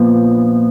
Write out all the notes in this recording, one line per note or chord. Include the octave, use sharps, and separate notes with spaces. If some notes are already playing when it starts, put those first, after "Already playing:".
Already playing: A#2 F3 B3